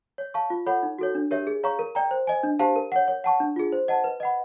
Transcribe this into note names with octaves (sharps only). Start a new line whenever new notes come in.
C#5
F5 A5 C#6
F4
A4 C#5 F#5 B5
D#4
F#4 A4 C#5
D4
G4 A#4 C#5 E5
G#4
C#5 F5 A#5 C#6
A#4
D5 G5 A#5
C5
D#5 G#5
D4
G4 C5 F5 A5
A#4
C#5 F#5
C#5
F#5 A5 C#6
D4
F4 G#4
C5
D#5 F#5 A5
B4
D#5 F#5 B5